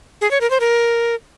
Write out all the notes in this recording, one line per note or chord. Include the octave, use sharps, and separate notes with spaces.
G#4
C#5
A#4
C5
A#4